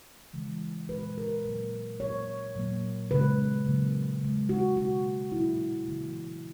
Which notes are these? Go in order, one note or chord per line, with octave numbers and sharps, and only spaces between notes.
C#3 E3 G#3
A#2 G#3 B4
A#4
A#2 F#3 A#3
A#2 F#3 A#3 C#5
A#2 F#3 A#3
C#3 G#3 B4
C#3 F#3 A#3
C#3 G#3
F#4
B2 A#3 F#4
A#2 F#3 A#3 E4
C#3 E3 A#3